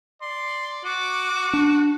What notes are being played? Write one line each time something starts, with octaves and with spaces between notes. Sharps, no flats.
D5 C6
F#4 D6
D4